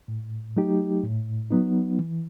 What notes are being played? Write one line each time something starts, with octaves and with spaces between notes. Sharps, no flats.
A2
F#3 A3 D#4 G4
A2
F#3 B3 D#4
E3